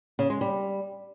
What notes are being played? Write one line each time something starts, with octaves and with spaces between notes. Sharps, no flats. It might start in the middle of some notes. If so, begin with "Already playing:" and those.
C#3
G#3
G3